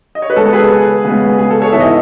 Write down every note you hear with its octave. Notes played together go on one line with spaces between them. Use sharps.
D#5
C#5
B4
C#3 G#3 B3 A4
G#4 B4
C#3 G#3 B3
G#4
A4
A4 C#5
G#2 E3 B3 E5
D#5